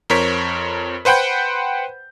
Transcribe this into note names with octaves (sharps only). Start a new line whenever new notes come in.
F2 A#4 C5 C#5 B6
B4 C5 F#5 G5 B5 G6